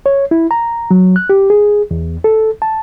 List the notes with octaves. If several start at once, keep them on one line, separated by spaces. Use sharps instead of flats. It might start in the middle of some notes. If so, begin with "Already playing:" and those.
C#5
E4
A#5
F#3
F#6
G4
G#4
E2
A4
A5